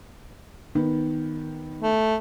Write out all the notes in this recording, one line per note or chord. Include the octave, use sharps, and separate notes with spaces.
D#3 B3
A3